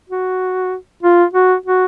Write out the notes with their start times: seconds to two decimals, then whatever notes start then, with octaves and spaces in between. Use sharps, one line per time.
0.09 F#4
1.03 F4
1.34 F#4
1.66 F#4